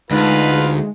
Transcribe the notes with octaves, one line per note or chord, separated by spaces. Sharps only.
D2 G#3 D#4 F4 B4